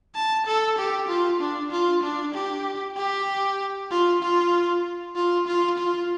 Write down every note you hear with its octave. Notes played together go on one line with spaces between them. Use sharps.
A5
A4
G4
F4
D4
F4
D4
G4
G4
F4
F4
F4
F4
F4